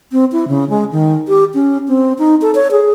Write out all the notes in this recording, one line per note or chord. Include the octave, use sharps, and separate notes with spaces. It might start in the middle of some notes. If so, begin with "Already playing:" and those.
C4
E4
C#3
G#3
D#3
G4
C#4
C4
D#4
A4
C#5
G#4